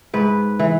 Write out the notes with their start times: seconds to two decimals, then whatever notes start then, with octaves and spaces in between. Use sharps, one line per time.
0.14 G#2 B4
0.59 E3